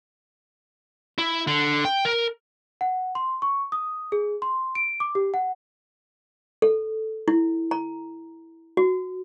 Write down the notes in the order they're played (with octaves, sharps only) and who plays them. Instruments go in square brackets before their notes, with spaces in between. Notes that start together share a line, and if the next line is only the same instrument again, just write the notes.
[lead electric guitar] E4
D3
G5
A#4
[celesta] F#5
C6
C#6
D#6
G#4
C6
D7
D6
G4
F#5
[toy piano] A4
E4
A#5
F#4